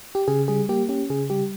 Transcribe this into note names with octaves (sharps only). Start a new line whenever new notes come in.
G4
C#3 G#4
G3 G#4
A#3 G4
C#4 G4
C#3 G#4
G3 G4